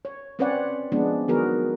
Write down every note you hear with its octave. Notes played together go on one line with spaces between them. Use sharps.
C#5
C4 C#4 B4 C#5 D5 F#5
F3 G#3 B3 D4
D#3 F#3 B3 F#4 G#4 A#4